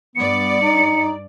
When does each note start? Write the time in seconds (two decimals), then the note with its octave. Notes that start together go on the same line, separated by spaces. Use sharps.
0.16 G2 B3 D5 C#7
0.62 D#4